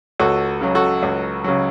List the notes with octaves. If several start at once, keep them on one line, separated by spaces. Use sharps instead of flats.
C#2 F#4 A4
C#3 F#3
F#4 A4
C#2
C#3 F#3